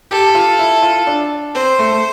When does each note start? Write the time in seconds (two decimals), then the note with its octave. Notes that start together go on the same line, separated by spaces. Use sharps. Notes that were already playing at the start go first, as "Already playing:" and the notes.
0.11 G4 A4
0.35 F4
0.59 E4
0.82 F4
1.07 D4
1.55 C4 C5
1.79 A3